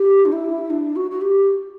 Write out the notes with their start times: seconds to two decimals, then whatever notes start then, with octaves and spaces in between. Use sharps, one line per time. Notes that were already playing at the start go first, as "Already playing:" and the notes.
Already playing: G4
0.25 D4
0.32 E4
0.70 D4
0.96 F#4
1.11 F#4
1.21 G4